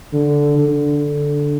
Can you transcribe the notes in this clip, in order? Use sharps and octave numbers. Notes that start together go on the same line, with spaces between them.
D3
D3